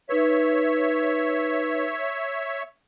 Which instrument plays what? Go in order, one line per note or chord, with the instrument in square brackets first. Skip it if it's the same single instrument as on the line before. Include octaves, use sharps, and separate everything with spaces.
[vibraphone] D#4 B4 [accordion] C#5 E5